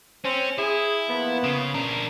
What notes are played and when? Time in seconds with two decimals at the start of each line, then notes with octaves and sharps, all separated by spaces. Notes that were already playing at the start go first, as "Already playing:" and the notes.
0.25 C4 C#4
0.58 E4 G#4
1.08 F3 A#3 B3
1.44 C#3
1.74 D4 A#4